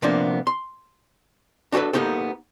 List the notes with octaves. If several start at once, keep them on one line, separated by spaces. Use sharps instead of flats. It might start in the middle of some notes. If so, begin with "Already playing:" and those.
C3 F3 A#3 B3 D4
C6
D4 F#4 G4 A4 B4
A#3 B3 D#4 G4 A4